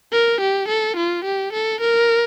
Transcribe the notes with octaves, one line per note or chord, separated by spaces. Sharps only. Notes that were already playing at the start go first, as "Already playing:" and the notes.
A#4
G4
A4
F4
G4
A4
A#4